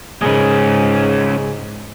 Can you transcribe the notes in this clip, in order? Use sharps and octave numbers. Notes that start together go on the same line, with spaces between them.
G#2 C#3 G#3 C#4 A#4 B4